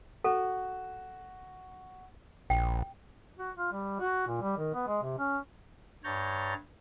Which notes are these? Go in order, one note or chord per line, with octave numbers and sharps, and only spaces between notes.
F#4 A4
A#1 G5
F#4
F4
G3
F#4
A#2
G3
D#3
B3
G#3
C3
C#4
G2 C#5 A#5 G6 A6